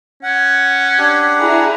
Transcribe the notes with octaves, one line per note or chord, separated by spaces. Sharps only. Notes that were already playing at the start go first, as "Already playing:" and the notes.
C#4 F#5
D4 G4
E4 G#4 A#5